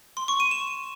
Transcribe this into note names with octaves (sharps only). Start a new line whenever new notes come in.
C6
C#6
D#7
E7